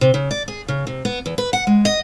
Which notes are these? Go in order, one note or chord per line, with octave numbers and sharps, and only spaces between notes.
C3
C#3
D5
G#4
C#3
C3
B3
E2
B4
F#5
G#3
D#5